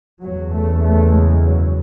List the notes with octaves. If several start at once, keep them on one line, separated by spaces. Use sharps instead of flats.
F#1 E2 C#3 F#3
A3
A3
G#3
F#3